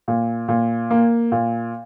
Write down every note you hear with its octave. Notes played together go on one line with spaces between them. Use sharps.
A#2
A#2
A#3
A#2